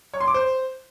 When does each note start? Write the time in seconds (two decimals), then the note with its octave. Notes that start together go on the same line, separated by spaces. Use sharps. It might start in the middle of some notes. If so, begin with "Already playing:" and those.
0.14 C#5
0.20 C6
0.27 D6
0.34 C5